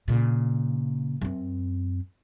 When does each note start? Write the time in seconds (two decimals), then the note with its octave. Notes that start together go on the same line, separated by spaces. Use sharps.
0.08 A#2 C#3
1.21 F#2 C4